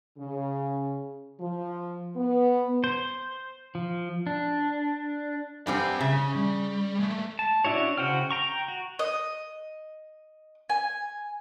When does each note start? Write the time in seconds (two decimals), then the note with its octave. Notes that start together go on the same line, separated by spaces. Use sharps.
0.18 C#3
1.40 F3
2.16 B3
2.84 C5
3.75 F3
4.27 D4
5.67 G2 G3 C4 F#5 G#5
6.01 C#3 E5
6.14 C#4
6.35 G3
7.00 G#3 A3
7.39 A5
7.65 C#4 D4 E4 F#4 C#5
7.98 C#3 F#4 C5 G5 F6
8.31 G5 A#5 C#6
8.68 F#4
8.99 D#5
10.70 G#5